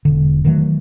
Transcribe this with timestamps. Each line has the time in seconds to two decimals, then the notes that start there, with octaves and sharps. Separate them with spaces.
0.05 E1 D3
0.45 D#3 E3 F#3 A3